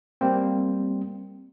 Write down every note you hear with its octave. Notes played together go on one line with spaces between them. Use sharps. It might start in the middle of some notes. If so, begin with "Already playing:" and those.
G3 A#3 C4